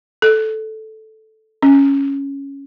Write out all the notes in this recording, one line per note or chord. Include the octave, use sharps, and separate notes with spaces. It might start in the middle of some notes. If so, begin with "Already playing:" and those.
A4
C#4